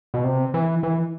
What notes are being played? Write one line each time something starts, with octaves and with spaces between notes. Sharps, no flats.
B2
C3
E3
E3